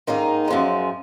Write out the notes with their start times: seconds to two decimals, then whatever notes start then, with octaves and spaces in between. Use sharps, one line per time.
0.07 G#2 D#3 A#3 D#4
0.48 F#2 F3 G#3